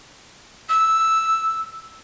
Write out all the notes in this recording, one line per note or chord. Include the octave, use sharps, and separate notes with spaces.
E6